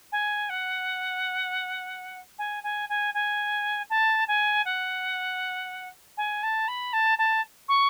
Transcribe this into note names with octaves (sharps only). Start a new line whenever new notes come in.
G#5
F#5
G#5
G#5
G#5
G#5
A5
G#5
F#5
G#5
A5
B5
A5
A5
C#6